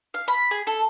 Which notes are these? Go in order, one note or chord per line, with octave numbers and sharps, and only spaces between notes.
F5
B5
G#4
A4